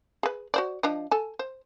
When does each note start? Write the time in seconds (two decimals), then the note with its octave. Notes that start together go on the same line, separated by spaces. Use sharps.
0.23 G#4 B4
0.54 F#4 C5 D5
0.83 F3 D4 D#5
1.11 A4 G#5
1.39 C5